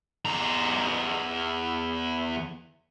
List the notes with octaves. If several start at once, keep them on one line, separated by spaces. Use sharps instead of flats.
E2 A#5